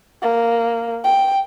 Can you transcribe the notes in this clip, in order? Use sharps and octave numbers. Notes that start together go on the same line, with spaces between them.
A#3
G5